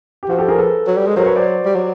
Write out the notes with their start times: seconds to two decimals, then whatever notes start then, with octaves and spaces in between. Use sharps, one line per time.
0.23 G4
0.29 F3 F#4
0.38 G4 A4
0.48 G#4 A#4
0.58 A4 B4
0.87 F#3
0.97 G3
1.07 G#3
1.16 F#3 A#4 C5
1.26 B4 C#5
1.36 C5 D5
1.65 G3
1.75 F#3